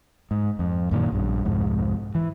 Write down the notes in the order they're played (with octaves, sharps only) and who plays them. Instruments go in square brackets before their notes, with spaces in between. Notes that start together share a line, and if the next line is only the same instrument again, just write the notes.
[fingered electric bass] G#2
F2
F#2 A#2 D#3
A#1 G2
C2 F2 G#2
E3